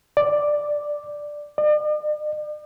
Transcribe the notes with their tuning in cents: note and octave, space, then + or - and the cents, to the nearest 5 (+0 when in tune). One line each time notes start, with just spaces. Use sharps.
D5 +5
D5 +45